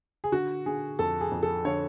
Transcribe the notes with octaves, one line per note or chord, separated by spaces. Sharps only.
G#4
D3 F#4
D3 G#4
F2 A4
G#4
F2
A4
D3 C#5